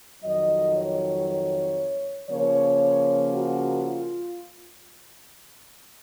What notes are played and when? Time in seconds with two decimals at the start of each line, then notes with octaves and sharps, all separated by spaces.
0.23 F2 D#3 F#3 D#5
0.75 C#5
2.30 C#3 F3 A#3 C#5
3.34 F#4
3.85 F4